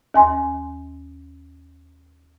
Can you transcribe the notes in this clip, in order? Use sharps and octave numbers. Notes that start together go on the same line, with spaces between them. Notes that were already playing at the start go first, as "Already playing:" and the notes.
D#2 G#5 C6